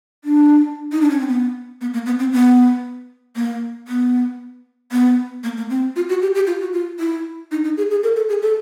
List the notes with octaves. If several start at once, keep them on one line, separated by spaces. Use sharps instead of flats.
D4
D#4
D4
C#4
C4
B3
B3
A#3
B3
C4
B3
A#3
B3
B3
A#3
A#3
C4
F4
F#4
G4
G4
F4
F#4
F4
E4
D#4
D#4
G#4
G#4
A#4
A4
G#4
A4